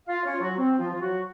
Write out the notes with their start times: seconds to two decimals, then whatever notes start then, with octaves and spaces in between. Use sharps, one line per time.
0.08 F4 F5
0.25 C#4 C#5
0.33 F4
0.41 F#3 F#4
0.57 C4
0.78 F3 F4
0.93 F4
1.00 F#3 F#4